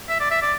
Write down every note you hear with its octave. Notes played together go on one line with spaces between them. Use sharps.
E5
D5
E5
D5